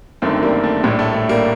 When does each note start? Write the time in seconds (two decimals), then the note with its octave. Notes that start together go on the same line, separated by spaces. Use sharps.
0.22 G1 F#2 D#3 A3 C4
0.43 G3 A#3
0.64 A3
0.83 A#1 A2 G3
0.99 A3
1.14 A3
1.29 G3 A#3